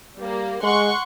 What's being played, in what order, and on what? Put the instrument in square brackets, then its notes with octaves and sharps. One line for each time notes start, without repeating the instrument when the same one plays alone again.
[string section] G3 A#3
[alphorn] G#3 [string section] F#5 C6 C#6